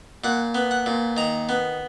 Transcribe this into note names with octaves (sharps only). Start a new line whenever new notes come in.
A#2 F#5
B3
F#5
A#2
D#3 A#5
B3